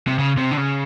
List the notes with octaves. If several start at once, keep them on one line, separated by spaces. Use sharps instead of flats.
C3
C#3
C3
D3
C#3